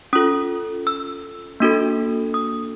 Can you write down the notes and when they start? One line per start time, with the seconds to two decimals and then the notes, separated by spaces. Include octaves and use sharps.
0.13 C#4 F4 A4 D#6
0.87 E6
1.60 A#3 D4 F#4 A4
2.34 D#6